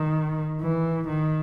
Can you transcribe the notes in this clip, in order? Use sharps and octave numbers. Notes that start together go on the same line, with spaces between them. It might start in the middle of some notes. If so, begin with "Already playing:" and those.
Already playing: D#3
E3
D#3